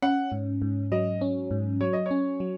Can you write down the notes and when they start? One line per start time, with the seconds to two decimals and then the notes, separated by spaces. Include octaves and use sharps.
0.02 C#4 F#5
0.32 G#2
0.62 G#2
0.92 F#3 D#5
1.21 C#4
1.51 G#2
1.81 F#3 C#5
1.93 D#5
2.06 C#4 C#5
2.40 F#3